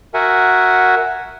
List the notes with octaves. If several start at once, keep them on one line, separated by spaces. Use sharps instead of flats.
F#4 A#4 E5 F#5 G#5